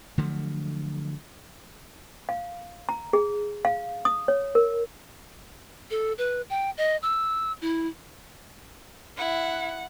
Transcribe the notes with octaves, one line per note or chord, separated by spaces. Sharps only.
D3 F3 F#3 A3
F5
A#5
G#4
F5
D#6
C#5
A#4
A4
B4
G5
D#5
E6
E4
E4 F#5